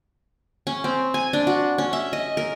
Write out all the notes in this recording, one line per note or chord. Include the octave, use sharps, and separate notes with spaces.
C#4
C4
G#5
D4
F#4
C#4
E5
D#5
A#4